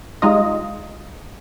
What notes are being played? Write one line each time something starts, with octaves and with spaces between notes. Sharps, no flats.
G3 G#3 D#4 F4 D#5